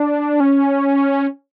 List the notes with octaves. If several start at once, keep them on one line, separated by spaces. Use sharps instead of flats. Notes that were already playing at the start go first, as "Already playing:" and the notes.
Already playing: D4
C#4